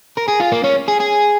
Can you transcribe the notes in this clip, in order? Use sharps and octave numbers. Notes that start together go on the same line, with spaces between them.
A#4
G#4
F4
A#3
C#4
G#4
G#4